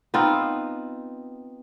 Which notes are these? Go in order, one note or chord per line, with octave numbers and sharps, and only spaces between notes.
B3 C4 D#4 F4